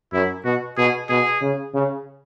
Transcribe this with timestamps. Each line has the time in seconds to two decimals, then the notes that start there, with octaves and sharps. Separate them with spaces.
0.13 F#2 E4
0.45 B2 F#4
0.77 B2 G#4
1.09 B2 G#4
1.42 C#3
1.74 C#3